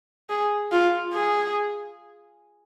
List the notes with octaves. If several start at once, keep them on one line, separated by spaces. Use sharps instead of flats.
G#4
F4
G#4